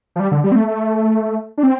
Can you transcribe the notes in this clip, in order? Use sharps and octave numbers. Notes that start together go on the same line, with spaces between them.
F3
G3
D3
G3
C4
A3
A3
D4
C4